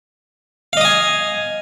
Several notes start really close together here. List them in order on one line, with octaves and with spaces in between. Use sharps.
F5 D#5 D#6 G#5